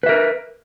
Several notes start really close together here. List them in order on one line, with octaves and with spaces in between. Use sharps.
B4 E5 A#4